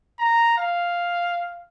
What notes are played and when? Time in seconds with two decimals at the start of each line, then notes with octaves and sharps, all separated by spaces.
0.19 A#5
0.58 F5